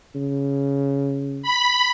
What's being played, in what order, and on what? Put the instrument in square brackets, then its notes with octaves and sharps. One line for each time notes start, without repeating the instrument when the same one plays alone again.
[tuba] C#3
[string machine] B5